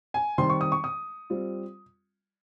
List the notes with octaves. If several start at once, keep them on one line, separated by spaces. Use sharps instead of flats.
G#5
D#3 G3 C4 C6
C#6
D#6
C#6
D#6
G3 C4 F4